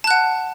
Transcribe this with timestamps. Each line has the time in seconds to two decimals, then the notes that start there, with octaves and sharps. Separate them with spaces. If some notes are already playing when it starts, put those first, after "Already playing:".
0.04 A5
0.07 F#6
0.11 F#5